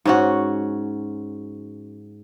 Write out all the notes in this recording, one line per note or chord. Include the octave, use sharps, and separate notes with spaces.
G#2 C#4 F#4